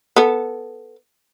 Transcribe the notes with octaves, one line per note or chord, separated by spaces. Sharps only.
B3 A4